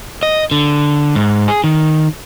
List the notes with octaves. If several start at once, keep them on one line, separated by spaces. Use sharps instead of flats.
D#5
D3
G#2
G#4
D#3